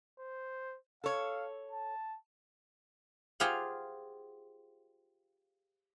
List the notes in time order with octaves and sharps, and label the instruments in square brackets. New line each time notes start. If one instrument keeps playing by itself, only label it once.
[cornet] C5
[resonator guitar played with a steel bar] A4 C#5 [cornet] F5
[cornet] A5
[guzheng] F4 G4 G#4 C5 F5 F#5